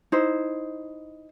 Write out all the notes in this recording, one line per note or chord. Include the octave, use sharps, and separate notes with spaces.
D#4 E4 C5